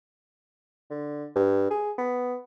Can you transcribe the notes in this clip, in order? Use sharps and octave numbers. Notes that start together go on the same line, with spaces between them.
D3
G2
G#4
B3